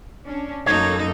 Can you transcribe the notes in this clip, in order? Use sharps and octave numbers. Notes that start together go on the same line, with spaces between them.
C#4 D4
F#2 A#3 D#4 A4 C#5